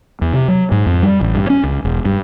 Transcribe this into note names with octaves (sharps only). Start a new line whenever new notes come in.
E2
C3
F#3
G#2
F2
G3
A1
G2
C#4
C#2
E1
G2